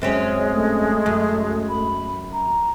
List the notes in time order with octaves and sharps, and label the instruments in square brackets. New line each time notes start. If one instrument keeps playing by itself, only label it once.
[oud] F#2 C4 C#4 [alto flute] G#3
[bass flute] A3
[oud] F#2
[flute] B5
A#5